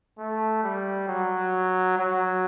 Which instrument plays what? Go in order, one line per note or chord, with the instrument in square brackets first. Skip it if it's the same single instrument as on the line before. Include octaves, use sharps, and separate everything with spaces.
[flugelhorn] A3
G3
F#3
F#3